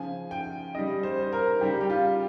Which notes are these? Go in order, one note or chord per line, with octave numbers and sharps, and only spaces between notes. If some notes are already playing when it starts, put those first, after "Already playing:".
Already playing: C#3 F3 G#5
G5
C#3 G3 D#5
C5
C5
A#4
C#3 G3 G4
G4
F4